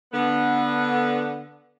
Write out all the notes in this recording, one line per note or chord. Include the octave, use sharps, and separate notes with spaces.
D3 B3